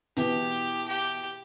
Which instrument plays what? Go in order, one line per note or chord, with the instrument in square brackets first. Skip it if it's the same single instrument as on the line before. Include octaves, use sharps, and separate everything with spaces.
[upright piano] B2 E3 [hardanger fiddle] G4
[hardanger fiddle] G4